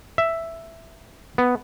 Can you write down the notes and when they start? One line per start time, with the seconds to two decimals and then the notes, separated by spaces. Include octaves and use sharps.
0.18 E5
1.38 B3